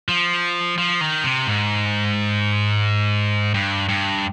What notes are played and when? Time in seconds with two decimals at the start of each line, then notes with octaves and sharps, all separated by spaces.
0.09 F3
0.78 F3
1.01 D#3
1.24 C3
1.47 G#2
3.54 G2
3.89 G2